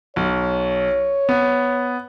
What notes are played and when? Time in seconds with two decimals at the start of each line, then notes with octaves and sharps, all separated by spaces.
0.16 B1 C#5
1.29 B3